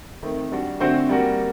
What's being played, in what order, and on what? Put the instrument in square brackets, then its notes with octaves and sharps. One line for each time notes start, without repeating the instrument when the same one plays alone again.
[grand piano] D#3 A3 C4
G3 D4 F#4
D3 A3 C4 F#4 C5
G3 A#3 F#4